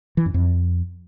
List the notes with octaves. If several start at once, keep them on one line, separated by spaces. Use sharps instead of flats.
E3
F#2
F2